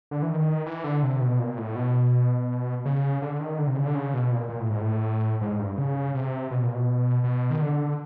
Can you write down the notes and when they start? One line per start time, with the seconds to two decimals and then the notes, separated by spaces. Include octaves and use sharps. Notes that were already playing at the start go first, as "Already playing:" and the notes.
0.11 D3
0.22 E3
0.29 D#3
0.66 E3
0.84 D3
1.03 C3
1.21 B2
1.39 A#2
1.57 A2
1.76 B2
2.86 C#3
3.22 D3
3.40 D#3
3.58 D3
3.67 C3
3.76 C#3
3.86 D3
3.95 C#3
4.14 B2
4.32 A#2
4.50 A#2
4.60 A2
4.70 G#2
4.81 A2
5.41 G#2
5.59 G2
5.78 C#3
6.15 C3
6.51 B2
6.63 A#2
6.75 B2
7.24 B2
7.50 D#3
7.61 D3